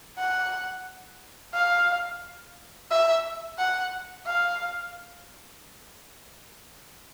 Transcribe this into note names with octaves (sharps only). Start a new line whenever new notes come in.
F#5
F5
E5
F#5
F5